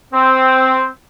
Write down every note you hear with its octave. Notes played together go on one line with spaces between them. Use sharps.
C4